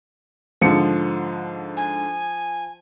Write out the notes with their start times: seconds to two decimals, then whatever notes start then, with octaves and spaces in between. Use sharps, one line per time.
0.61 G#2 D3 F3 C#7
1.77 G#5